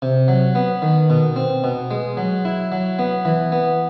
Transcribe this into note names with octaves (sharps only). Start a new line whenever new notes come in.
C3
F#3
B3
D#3
B2
C4
B2
G#3
F#3
E4
F#3
B3
E3
B3